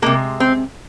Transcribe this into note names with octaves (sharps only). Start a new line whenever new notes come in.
C3 F3 G#3 A#3
C4